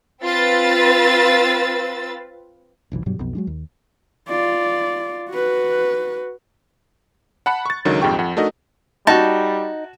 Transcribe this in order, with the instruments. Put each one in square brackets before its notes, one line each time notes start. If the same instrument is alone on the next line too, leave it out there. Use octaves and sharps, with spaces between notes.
[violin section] C4 F4 B4 E6 A6
[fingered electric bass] F1 B1 A2 E3
G2 B2 F#3 G3
B1 F2 B2
F#3 G#3 D4
D#2
[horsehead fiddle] F4 D5
F#4 B4
[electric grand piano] F#5 A5 B5 F#6 C#7
C#6 A6
C#2 D3 D#3 F#3
A#1 F2 G#2 G4 G5 C#6
F2 F#5
A3 D4 D#4 F#4 A#4 D#5
[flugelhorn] G3 [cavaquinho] D#4 [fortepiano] F#4 A5